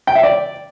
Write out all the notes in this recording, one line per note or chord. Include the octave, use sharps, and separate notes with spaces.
G5
E5
D5